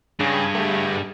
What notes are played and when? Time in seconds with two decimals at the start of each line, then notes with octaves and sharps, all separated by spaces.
0.20 G2 C#3 D4 G#4 G5
0.55 A3 B3 G4